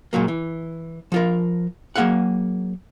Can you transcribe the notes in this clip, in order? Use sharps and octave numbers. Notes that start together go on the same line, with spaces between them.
C#2 A#2 F#3 A#3
E3
F3 F4 A#4
F#3 A#3 C4 G#4 F5 F#5